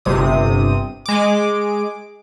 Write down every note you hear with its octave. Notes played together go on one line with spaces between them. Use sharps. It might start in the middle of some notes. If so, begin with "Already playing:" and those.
G1 C3 D#6
G#3 D6